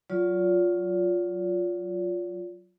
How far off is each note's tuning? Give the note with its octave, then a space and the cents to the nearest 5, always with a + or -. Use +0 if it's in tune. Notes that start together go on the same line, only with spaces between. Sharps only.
F#3 +0 F4 +10 D5 -45